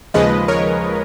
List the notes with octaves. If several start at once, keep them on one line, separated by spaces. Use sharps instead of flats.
D#2 C#3 F3 G#3 B4 D#5
A#4 C#5